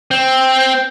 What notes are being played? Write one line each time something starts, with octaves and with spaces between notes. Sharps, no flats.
C4